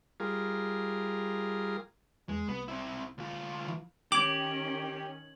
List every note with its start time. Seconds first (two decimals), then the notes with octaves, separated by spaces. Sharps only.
0.20 G3 F4 G#4 A#4
2.29 E2 G#3
2.48 C2 B3
2.68 C4 E4
3.18 D2 F4
3.68 E3
4.12 D#3 C#4 G4 D6 G#6 F#7